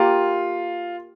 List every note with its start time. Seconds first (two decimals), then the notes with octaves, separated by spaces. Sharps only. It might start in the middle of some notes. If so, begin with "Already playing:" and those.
Already playing: A#3 F4 G4 A#4